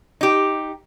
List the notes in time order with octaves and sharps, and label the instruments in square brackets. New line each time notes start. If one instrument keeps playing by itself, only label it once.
[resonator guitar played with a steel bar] D#4 G4